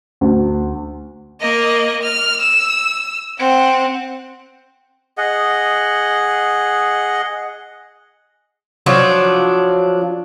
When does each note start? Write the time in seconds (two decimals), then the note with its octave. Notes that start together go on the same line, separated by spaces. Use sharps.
0.21 D2
1.40 A#3 D#5
2.03 F6
2.40 E6
3.39 C4 F#5
5.18 G#4 D#5 F#5
8.86 F3 F#3 D4